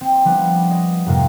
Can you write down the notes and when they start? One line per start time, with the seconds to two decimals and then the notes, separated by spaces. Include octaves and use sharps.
0.01 C4
0.25 F3 G3 B3 D4
0.71 D#5
1.06 F2 G#2 C3 A#3 D#5 F5